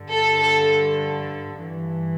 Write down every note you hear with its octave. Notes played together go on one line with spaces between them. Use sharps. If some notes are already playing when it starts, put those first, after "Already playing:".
Already playing: G2 D3
A4
A4
G2 E3